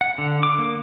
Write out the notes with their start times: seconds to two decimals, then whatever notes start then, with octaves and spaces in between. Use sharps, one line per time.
0.01 F#5
0.18 D3
0.43 D6
0.59 A#3